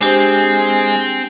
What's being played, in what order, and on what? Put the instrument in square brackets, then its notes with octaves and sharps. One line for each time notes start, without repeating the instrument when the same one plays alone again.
[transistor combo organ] G#3 [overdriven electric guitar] C4 [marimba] D4 G4 C5